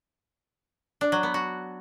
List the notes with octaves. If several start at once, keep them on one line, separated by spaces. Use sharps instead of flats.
D4
F#3
B3
F#4